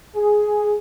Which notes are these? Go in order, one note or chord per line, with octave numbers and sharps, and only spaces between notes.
G#4